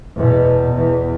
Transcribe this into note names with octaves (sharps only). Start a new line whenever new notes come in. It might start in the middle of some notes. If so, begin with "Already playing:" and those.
E2 B2
E2